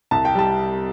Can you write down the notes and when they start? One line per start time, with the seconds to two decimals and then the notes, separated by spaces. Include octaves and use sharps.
0.11 C2 A5
0.25 G5
0.35 G3 A5